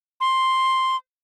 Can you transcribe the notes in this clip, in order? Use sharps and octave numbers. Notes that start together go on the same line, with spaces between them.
C6